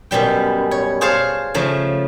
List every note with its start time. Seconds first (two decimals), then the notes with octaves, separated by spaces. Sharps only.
0.11 F#2 B2 G3 G5
0.71 C#5
1.01 G#4 C5 C#5 F5 A5
1.54 C#3 F3 A3